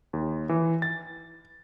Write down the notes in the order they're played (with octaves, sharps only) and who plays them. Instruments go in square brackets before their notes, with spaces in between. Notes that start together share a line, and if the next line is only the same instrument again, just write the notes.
[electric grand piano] D#2
E3
A6